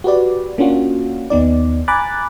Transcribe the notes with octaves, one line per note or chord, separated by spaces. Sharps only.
F#4 G4 B4 D5
A#3 C#4 D4 F4 F#4
D#2 B3 D#4 D5
G#5 A#5 B5 D6 F#6 A6